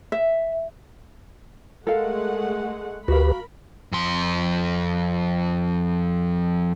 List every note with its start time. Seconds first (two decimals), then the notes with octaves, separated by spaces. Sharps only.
0.12 E5
1.87 G#3 A3 A4 A#4 F5 F#5
3.08 D2 F#4 G4 A#4 B4 F5 B5
3.92 F2 C6